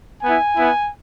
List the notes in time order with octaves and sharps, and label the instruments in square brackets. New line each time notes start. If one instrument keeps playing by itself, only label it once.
[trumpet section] B3 E4 G#5
B3 E4